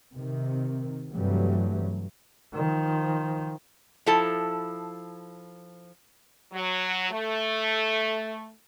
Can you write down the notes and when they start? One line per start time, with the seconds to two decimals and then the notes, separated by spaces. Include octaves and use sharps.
0.14 C3 D#3
1.12 G2 C3 E3 F#3 G3 A3
2.54 D#3 F3
4.06 F3 E4 A4 A5
6.52 F#3
7.10 A3